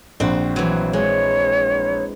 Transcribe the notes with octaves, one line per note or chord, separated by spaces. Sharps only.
A#1 C4 F#4
E3 F#3
G#3 C#5